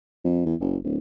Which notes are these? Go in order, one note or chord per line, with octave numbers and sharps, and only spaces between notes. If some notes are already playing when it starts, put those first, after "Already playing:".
F2
E2
F#1
D1